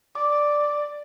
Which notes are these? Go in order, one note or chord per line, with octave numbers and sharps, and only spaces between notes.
D5 D6